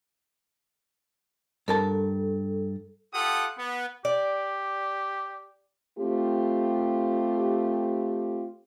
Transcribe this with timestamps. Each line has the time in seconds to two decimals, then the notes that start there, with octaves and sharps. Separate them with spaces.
1.68 G2 A4 A#4 A5
3.13 F4 G4 A4 F#5 D#6
3.58 B3
4.05 G4 D5
5.98 A3 C4 F4 G4